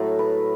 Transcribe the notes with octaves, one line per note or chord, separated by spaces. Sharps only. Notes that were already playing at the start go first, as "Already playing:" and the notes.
Already playing: A2 F#3 A3 A4
B4